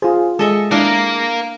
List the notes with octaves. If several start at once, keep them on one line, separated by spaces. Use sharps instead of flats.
F4 G#4 C5
G#3 G#4 A4 D#5 E5 C#7
D4 E4 A#4 F5